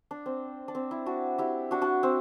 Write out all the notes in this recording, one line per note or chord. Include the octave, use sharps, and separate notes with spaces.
D4
C4
D4
C4
E4
D4 F#4
E4 G4
D4 F#4
D4 F#4
C4